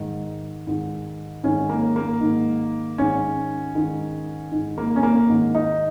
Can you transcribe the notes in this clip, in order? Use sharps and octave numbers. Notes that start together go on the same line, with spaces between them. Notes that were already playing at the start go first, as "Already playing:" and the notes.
Already playing: G#2 D#3
G#2 D#3
G#2 D#3 C#4
A#3
A#3
G#2 D#3
G#2 D#3 C#4
G#2 D#3
G#2 D#3
A#3
C#4
A#3
G#2 D#3
D#4